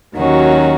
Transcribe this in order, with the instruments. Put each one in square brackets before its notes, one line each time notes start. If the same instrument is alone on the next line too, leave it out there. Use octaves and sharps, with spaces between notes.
[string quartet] D#2 D#3 F#3 C#4 F#4